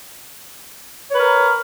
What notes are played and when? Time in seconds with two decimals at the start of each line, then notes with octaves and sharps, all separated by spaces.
1.10 C#5
1.14 B4
1.18 A#4